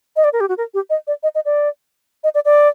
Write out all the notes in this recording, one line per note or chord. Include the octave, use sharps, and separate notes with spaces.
D#5
D5
A#4
G4
F#4
A#4
G4
D#5
D5
D#5
D#5
D5
D#5
D5
D5